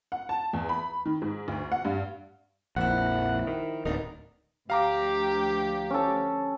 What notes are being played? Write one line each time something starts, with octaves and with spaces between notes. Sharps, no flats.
F#5
A5
E2
B5
D#3
G#2
D2
F#5
G2
A#1 F2 F3 G3 E4 F#5
D#3
D1 B3 D4 D#4 A#4
D2 F3 D4 G4 F5 A#5 D6
C#4 A4